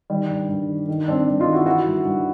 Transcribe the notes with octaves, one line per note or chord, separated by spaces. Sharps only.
D#3 G3
G2
G2
D#3
D#3
G2 C4 D4
G2
D#4 F4
D#3
E4 F#4
E3 E4 F#4
G2
G2